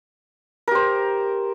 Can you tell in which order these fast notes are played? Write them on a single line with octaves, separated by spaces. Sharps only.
A#4 G4 C5